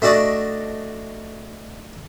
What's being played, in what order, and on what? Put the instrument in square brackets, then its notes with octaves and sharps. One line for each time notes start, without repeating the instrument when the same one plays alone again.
[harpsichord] A3 D4 F#4 D5 D#5